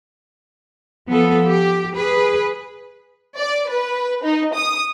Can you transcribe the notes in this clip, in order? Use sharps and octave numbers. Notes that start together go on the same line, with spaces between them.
F3 B3 A4
G4
G#4 B4
D5
B4
D#4
D#6